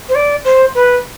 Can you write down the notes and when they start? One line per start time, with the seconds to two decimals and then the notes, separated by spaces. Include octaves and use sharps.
0.09 C5
0.15 D5
0.44 C5
0.75 B4